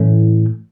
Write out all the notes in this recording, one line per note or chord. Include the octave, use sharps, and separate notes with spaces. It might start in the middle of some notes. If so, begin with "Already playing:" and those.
Already playing: A2 E3 A3 C#4